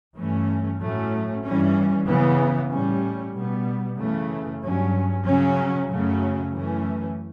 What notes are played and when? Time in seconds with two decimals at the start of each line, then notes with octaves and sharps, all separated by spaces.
0.16 G2 E3 A3 C#4
0.80 A2 F#3 A3 C#4
1.43 G2 E3 G3 C#4
2.07 C#3 E3 B3
2.71 A2 G3 C#4
3.35 B2 G3 B3
3.98 F#2 C#3 E3 A3
4.63 G2 F#3 C#4
5.26 C#3 F#3 C#4
5.89 F#2 C#3 F#3 A3 C#4
6.53 F#2 E3 A3 C#4